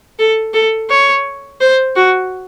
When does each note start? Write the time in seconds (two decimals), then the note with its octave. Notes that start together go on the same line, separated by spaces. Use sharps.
0.19 A4
0.54 A4
0.90 C#5
1.61 C5
1.96 F#4